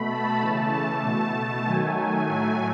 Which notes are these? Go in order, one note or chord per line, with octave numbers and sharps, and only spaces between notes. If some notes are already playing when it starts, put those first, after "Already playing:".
Already playing: B2 A3 B5
A5
C#3 E3 A3
A5
B2 A3
D#3 F#3 A3 G#5
A2 F#3 A3